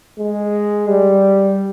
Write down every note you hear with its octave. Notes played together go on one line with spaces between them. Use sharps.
G#3
G3